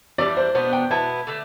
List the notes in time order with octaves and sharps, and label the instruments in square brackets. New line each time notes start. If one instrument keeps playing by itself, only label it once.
[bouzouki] E3 G3 D4 [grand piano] D5
[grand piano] C5
[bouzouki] B2 B3 D4 [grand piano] C5
[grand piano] G5
[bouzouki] B2 B3 E4 [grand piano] A5
[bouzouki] D3 A3